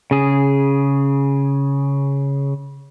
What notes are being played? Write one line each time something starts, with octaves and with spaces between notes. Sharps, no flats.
C#3 G#4